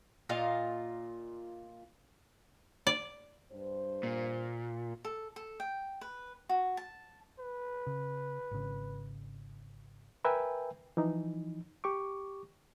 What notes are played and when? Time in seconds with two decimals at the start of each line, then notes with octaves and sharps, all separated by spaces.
0.29 A#2 F4 D#5 F5
2.87 D5
3.51 G2 C5
4.03 A#2
5.05 A4
5.36 A4
5.60 G5
6.01 B4
6.49 F#4
6.77 A5
7.39 B4
7.87 C#3
8.51 G#1 C#3
10.25 A#4 B4 E5 G5 G#5
10.97 E3 F3 D#4
11.84 G4 C#6 D6